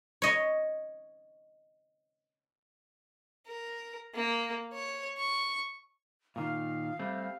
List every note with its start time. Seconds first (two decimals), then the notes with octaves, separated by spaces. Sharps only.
0.22 C#5 D#5
3.47 A#4
4.14 A#3
4.73 C#5
5.18 C#6
6.36 A#2 D#3 F5
6.99 G3 A3 C4